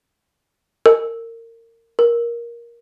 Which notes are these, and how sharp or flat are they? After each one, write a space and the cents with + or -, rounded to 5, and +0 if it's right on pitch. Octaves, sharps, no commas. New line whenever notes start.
A#4 -25
A#4 +15